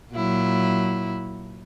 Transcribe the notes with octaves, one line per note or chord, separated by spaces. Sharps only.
A#2 F#3 E4